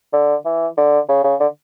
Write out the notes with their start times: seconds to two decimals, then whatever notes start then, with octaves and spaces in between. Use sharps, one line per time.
0.13 D3
0.45 E3
0.77 D3
1.09 C#3
1.24 C#3
1.40 D3